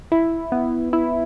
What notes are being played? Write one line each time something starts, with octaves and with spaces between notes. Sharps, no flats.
E4
B3
E4